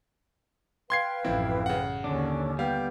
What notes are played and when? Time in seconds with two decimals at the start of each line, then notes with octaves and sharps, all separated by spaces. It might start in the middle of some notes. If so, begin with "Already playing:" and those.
0.90 B4 F5 G5 C6 G#6 C7
1.25 A1 F#2 E3 F3 C4 E4
1.66 C#3 F#5
2.04 D#2 D3 C#4 D4
2.59 G3 B3 F5 G5 G6